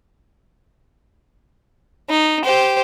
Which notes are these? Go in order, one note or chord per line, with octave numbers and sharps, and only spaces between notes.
D#4
G4 C5